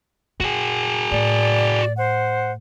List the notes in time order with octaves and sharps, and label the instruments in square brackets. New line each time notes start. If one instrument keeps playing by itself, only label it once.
[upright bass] A#2 [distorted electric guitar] F#4 G#4
[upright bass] A2 [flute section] D5
[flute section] C5 F#5